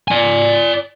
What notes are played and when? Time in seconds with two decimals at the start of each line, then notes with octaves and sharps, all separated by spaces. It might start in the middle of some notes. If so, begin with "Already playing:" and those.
0.08 D5 G#5